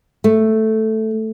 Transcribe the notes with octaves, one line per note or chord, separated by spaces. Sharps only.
A3